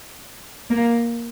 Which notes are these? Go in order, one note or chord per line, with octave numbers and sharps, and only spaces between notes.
A#3